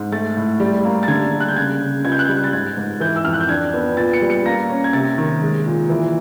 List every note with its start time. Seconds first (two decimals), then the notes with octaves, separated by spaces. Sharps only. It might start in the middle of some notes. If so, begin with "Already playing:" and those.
Already playing: G#2
0.12 A3 A6
0.36 A2
0.60 G3
0.84 A#3
1.03 A6
1.08 D3 G#6
1.33 G3
1.40 F#6
1.48 G6
1.56 C#3 G#6
1.81 C#3
2.05 C#2 G#6
2.12 G6
2.19 F#6
2.25 G3 G6
2.44 A6
2.53 G#2 G#6
2.77 G#2
3.00 E3 G6
3.16 E6
3.24 F2 F6
3.33 F#6
3.40 G6
3.49 D4 G#6
3.74 B3
3.97 A#2 A6
4.14 C#7
4.21 G3
4.30 C#7
4.46 A#3 A#6
4.69 C#4
4.84 G#6
4.93 C3 A6
5.18 D#3
5.42 G#3
5.66 A#2
5.89 E3